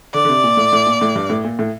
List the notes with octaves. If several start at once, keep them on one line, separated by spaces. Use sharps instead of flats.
D3 D5
D3
C3
A#2
A2
A2
A#2
A2
G2
A2
A#2
A2